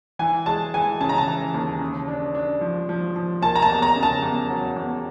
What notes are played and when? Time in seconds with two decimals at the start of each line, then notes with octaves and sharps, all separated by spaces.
0.19 E3 G#5
0.46 G#3 A5
0.74 E3 G#5
1.01 C#3 A5
1.09 A#5
1.18 A5
1.28 E3
1.54 D#2
1.80 C#3
2.08 D4
2.35 D4
2.61 F3
2.89 F3
3.16 F3
3.42 A#3 A5
3.55 A#5
3.62 A5
3.69 E2
3.82 A#5
3.96 C#3
4.03 A5
4.22 E2
4.50 F#3
4.76 E2